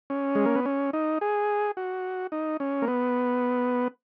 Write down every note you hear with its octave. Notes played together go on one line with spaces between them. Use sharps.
C#4
G#3
A#3
B3
C#4
D#4
G#4
F#4
D#4
C#4
A#3
B3